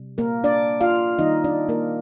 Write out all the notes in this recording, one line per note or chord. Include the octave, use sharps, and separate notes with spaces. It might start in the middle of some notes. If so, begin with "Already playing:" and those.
Already playing: C3 G3
A#3 A#4
D4 D5
F4 F5
D#3 G3 A#3 D#4 D#5
D4 D5
A#3 A#4